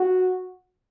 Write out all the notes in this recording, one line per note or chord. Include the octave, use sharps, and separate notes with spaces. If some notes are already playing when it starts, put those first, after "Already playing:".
Already playing: F#4